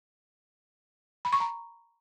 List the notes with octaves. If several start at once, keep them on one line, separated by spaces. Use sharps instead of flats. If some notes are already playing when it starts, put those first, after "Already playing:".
B5
C#6
A#5